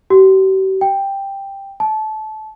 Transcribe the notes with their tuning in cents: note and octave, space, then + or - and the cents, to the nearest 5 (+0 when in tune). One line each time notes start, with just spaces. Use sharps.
G4 -45
G5 +10
A5 -25